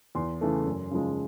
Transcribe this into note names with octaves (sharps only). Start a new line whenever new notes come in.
E2 C6
C#3 E3 A3
F#2
C#3 F3 G#3